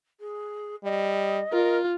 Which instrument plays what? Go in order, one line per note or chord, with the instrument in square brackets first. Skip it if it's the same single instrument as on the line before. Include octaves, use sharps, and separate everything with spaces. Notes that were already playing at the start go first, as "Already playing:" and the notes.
[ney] G#4
[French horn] G3 [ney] D#5
[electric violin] F4 [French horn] A#4